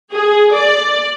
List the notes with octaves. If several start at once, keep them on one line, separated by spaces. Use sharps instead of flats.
G#4
D5